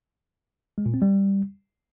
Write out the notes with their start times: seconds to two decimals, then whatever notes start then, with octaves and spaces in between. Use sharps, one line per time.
0.78 G#3
0.86 A#2
0.94 C4
1.02 G3